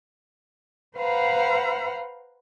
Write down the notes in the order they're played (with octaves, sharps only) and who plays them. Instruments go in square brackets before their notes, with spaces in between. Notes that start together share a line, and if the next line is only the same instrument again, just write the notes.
[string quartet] B4 C5 F5 F#5 A#5 B5